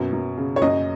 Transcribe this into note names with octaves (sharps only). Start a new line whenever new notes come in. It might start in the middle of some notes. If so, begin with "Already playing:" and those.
Already playing: F#2 B2
F#2
C#3
C#5
F#2 D#5